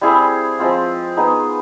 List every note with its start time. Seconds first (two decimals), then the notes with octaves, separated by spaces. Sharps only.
0.01 G3 C4 E4 G#4
0.59 F3 G#3 C4 F4
1.17 B3 D#4 G#4